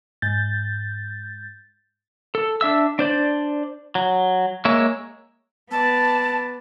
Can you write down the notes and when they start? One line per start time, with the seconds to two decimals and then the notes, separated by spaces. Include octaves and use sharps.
0.22 G#2 G6 A6
2.35 A4
2.61 D4 E5 E6
2.99 D4 C5 D5
3.95 F#3
4.65 G#3 A#3 C#5 E5
5.71 B3 D5 A5